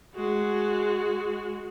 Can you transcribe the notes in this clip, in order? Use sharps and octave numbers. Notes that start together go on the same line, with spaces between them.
G#3 F#4